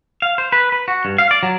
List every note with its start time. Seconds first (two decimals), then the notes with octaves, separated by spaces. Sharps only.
0.22 F5
0.38 C5
0.52 B4
0.72 B4
0.88 F#4
1.05 G2
1.18 F5
1.31 D5
1.43 F#3